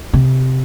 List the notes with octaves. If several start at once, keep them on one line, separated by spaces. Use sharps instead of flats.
C3